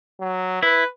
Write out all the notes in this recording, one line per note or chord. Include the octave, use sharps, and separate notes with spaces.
F#3
E4 B4